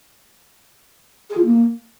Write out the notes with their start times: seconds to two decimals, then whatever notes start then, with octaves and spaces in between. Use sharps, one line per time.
1.30 G#4
1.37 F4
1.44 A#3